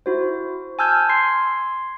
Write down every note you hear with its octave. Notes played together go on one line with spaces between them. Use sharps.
E4 F#4 C5
G#5 A5 E6 F6 G6 G#6
C6 G#6 C7